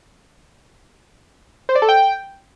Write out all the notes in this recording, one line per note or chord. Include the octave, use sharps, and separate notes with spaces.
C5
D5
A4
G5